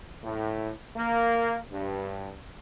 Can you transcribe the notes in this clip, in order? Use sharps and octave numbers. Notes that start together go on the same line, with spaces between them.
A2
A#3
G2